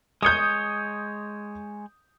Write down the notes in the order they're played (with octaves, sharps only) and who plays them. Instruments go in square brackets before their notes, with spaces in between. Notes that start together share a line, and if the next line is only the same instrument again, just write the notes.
[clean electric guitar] G#3 C#5 [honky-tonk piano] D#6 G6